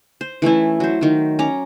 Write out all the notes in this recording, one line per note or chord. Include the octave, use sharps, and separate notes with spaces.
C5
E3 A3 C#4 E4
F#3 C5
D#3 F#3
C#4 A#5 D6